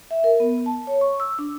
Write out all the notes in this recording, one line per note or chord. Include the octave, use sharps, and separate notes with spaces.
E5
A#4
B3
A5
C#5
C#6
E6
D4